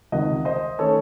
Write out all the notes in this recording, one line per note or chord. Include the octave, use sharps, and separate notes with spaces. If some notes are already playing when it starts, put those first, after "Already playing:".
C#2 C3 D#3 D#5 F#5
C5 D#5
D#3 A3 C#4 A4 C#5